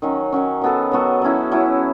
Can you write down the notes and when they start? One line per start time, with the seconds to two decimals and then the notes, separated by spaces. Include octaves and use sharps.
0.02 D#3 F#3 C#4
0.32 D#3 F#3 C#4
0.62 F#3 B3 F#4 A4
0.91 F#3 B3 F#4 A4
1.22 F#3 C#4 E4
1.52 F#3 C#4 E4